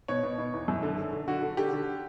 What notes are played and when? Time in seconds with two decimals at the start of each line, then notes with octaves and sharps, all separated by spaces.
0.08 B2 C#5
0.23 B2
0.38 B2
0.53 E2
0.68 F#2
0.83 D3
0.98 D3
1.13 D3
1.28 D3 F#4
1.42 D3
1.57 D3 G4
1.73 D3